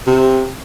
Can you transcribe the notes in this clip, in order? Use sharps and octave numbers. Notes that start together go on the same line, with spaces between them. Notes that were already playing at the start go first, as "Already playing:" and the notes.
C3